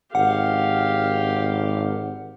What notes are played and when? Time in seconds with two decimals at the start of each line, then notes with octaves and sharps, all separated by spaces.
0.15 G#1 G4 F5 F#5